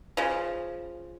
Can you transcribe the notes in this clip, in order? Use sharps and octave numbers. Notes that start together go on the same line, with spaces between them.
C#3 F3